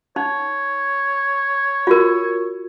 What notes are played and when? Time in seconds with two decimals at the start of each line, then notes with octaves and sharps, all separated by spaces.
0.16 D#4 C#5
1.87 F4 F#4 A#4